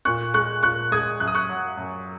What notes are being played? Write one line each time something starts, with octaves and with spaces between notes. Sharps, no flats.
A#2 C#6 F#6
G#3 C#6 F#6
A#2 C#6 F#6
G#3 D#6 G#6
F#2 F#6
D#6
C#6 F#6
F#3
F#2